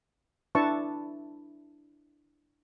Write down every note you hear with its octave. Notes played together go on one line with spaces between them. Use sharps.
D4 E4 B4 E5 A5 C#6